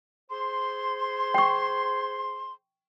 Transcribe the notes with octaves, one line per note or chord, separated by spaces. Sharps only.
G#4 C5 C6
G5 C#6